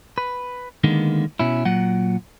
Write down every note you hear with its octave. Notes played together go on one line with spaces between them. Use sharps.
B4
D3 D#3 G#3 A#3 B3
B2 C#4 E4
A#2 F#3 F#5